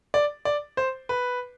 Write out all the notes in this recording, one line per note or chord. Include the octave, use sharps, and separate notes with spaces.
D5
D5
C5
B4